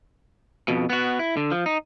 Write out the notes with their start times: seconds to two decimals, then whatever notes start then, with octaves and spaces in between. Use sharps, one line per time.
0.68 F2 B2
0.90 B3 F#4
1.19 E4
1.37 D3
1.51 F3
1.66 D#4